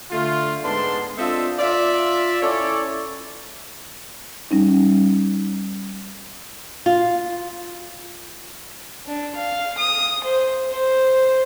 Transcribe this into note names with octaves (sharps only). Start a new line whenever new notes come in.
D3 A3 F4
G#2 G#3 B3 D4 A5 C6
C4 D4 F4 A4 D#5 E5
F4 D5 E5
C#4 E4 A4 C#5 D5
G3 C#4 D#4
F4
D4
F5
D#6
C5
C5